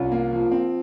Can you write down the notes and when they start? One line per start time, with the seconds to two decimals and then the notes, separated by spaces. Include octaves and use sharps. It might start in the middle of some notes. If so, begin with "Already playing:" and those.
Already playing: C2 C#4 F4
0.12 A#3
0.32 F3
0.51 C4